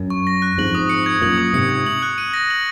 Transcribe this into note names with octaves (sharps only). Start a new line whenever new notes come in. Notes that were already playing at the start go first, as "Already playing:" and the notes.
Already playing: F#2
C#6
A#6
F#6
F2 G#2 F#7
D#6
C#7
G#6
F#2 A#2 F#7
D#6
G#2 C3 C#7
G#6
F#7
F#6
D#7
A#6
F#7